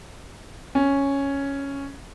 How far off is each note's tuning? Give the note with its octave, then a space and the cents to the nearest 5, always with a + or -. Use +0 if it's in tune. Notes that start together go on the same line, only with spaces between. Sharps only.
C#4 +0